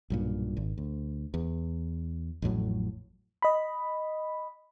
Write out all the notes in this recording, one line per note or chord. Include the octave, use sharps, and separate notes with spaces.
B1 G2 A#2
G#1
D2
E2
A1 F2 A2 F#3
D#5 B5